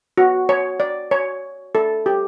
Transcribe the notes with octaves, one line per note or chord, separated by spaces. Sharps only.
F#4
C#5
D5
C#5
A4
G4